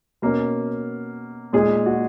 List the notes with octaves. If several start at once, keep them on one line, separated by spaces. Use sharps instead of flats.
B2 A#3 C#4
A#2 G#3 D#4 G#4
F#4